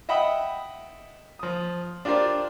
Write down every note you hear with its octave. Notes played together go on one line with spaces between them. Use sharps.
D#5 E5 F#5 G5 B5 D#6
F3 D#6
D4 F4 G4 A#4 C5 D5